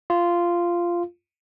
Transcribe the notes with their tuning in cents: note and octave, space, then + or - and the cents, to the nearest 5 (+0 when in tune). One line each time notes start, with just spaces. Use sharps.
F4 -10